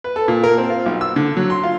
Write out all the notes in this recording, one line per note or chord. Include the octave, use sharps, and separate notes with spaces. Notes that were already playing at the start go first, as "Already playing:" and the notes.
B4
A4
A#2
A#4
C4
F4
B1
E6
D3
F#3
C6
F4